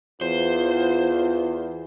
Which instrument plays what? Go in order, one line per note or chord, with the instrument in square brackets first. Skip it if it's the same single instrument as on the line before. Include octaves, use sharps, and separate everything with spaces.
[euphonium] E2 [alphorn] F4 [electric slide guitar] C5